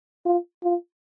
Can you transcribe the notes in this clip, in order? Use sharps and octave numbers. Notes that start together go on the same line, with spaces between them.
F4
F4